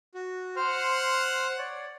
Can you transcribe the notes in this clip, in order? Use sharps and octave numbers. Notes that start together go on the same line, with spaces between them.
F#4
C5 F#5 C6 F6
C#5 D5